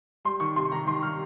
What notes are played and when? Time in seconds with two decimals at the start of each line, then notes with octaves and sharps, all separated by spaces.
0.25 G3 C6
0.40 D#3 C#6
0.56 C3 C6
0.72 D#3 A#5
0.86 D#3 C6
1.02 G3 F6